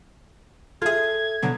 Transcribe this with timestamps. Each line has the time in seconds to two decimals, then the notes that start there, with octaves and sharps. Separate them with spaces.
0.82 F4 G#4 A4 E5 G#6
1.42 B2 D3 F#3